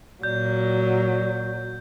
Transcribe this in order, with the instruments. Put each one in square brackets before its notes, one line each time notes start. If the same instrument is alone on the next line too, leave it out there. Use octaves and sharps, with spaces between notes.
[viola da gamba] A#2 [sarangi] F#3 [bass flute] D5 [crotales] G6